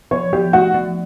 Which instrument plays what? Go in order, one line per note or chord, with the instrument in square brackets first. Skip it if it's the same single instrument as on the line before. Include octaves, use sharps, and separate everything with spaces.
[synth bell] F3 [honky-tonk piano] C#5
[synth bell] F3 [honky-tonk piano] G4
[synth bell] A3 [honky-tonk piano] F#4
[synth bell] F3